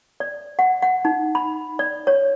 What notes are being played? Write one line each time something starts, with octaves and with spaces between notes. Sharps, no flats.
D5
F#5
F#5
D#4
B5
D5
C#5